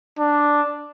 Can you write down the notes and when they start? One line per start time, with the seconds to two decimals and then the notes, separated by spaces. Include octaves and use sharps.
0.19 D4